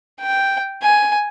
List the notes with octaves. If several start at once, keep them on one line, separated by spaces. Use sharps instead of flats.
G5
G#5